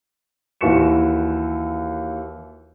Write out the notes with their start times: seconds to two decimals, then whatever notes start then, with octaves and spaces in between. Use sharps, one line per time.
0.61 D#2 E3 F#4 C#6 C#7 E7